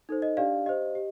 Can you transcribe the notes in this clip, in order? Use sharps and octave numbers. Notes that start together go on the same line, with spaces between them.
D#4 A4 C5
D#5
D4 G4 D5 F5
G4 C5 D#5
G4